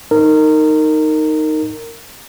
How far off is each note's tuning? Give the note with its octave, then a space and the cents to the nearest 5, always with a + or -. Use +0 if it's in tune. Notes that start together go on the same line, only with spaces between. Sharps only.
D#4 +0 A#4 -20